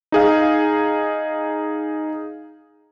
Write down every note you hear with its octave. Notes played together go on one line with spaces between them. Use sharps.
D#4 G#4 F5